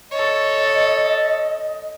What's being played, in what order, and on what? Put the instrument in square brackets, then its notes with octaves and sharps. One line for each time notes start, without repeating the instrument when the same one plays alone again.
[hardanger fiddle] A4 C#5 [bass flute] D#5